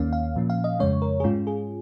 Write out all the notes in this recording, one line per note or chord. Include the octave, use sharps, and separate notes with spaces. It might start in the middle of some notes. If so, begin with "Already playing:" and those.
Already playing: D#2 D#3 A#3 C#4 F5
F5
A#2 F3 A#3 C#4
F5
D#5
F2 C#3 G#3 C#4 C#5
A#4
G#4
G#2 G#3 C#4 F4
G#4